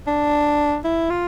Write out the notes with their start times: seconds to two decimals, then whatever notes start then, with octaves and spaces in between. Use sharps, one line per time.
0.07 D4
0.84 E4
1.10 F4